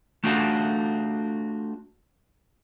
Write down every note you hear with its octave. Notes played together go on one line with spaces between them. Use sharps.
A3 D4 F4 F#4